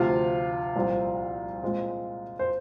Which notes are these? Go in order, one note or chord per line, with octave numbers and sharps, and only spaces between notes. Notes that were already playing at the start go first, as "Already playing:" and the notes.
Already playing: D2 C3 F3 F4 F5
C2 A#2 F3 C4
A#2 G#3 C4
C5